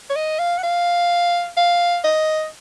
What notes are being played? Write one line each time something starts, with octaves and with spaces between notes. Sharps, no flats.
C#5
D#5
F5
F#5
F5
F5
D#5